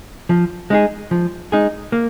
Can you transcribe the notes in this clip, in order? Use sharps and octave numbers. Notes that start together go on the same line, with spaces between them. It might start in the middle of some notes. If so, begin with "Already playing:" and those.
F3
G#3 D#4 G#4
F3
G#3 D#4 G#4
A#3